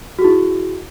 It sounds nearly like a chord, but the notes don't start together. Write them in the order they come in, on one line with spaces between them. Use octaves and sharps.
F#4 G#4 E4